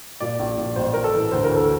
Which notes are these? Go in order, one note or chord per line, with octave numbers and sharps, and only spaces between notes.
A#2 D5
A#1
A#1
A1 C5
A1 A#4
A4
E3
D2 C5
A#4
D2
A4